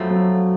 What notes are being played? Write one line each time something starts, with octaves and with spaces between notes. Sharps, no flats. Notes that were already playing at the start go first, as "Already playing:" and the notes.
Already playing: F2 F3 F#3 A3
F#3